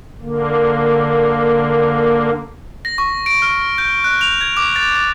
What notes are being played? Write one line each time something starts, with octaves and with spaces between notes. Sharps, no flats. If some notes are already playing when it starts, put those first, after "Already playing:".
D3 A#3
A#6
C#6
D7
F6
G6
F#6
F7
G#6
D6
A6
A6